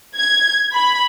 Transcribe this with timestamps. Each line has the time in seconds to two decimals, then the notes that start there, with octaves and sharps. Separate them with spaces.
0.16 G#6
0.74 B5